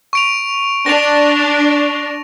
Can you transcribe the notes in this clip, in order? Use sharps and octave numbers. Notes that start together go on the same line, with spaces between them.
C#6 D7 F7
D4 A#6 F7